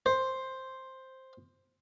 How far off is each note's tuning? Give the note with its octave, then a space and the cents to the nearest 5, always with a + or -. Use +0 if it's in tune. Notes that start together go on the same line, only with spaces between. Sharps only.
C5 +5